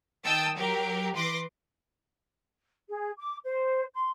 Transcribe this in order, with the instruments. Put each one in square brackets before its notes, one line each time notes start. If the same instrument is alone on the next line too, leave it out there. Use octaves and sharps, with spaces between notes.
[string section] D#3 G5 A5 D#6 E6
F#3 G4 A#4
E3 B4 C6 D6 A#6
[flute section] G#4
D6
C5
C6